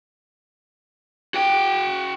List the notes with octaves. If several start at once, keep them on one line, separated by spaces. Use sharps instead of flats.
F#4 G5